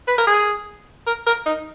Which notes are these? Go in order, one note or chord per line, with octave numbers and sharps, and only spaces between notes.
B4
A#4
G#4
A#4
A#4
D#4